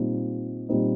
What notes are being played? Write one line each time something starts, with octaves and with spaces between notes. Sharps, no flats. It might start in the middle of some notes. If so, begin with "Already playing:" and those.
Already playing: A#2 G3 C4 D#4
A#2 G3 C4 D#4